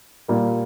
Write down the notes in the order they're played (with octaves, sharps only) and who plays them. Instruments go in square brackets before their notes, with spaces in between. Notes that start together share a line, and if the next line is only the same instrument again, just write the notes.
[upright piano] A#2 G3 A#3